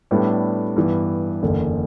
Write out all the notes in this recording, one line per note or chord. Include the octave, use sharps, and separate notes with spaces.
A2 G3 B3 D4 A4
G2 E3 B3
F#1 E2 D3